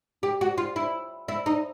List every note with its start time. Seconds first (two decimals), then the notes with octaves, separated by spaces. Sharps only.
0.23 G4
0.41 F#4
0.58 F4
0.76 E4
1.28 E4
1.46 D#4